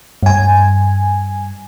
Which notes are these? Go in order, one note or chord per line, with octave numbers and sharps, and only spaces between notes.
G2 G#5